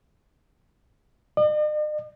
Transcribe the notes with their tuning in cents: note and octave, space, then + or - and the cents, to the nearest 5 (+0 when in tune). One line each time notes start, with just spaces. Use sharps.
D#5 -45